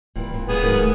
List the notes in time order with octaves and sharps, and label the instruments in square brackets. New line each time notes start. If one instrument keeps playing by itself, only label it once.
[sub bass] D1 [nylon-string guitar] A#2 E3 G3
[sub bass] D1 [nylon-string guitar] F2 A#2
[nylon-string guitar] A#2 C#3 G3 [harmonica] B3 G#4
[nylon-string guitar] G#2 D#3 F#3 [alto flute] A#4
[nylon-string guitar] G#2 A3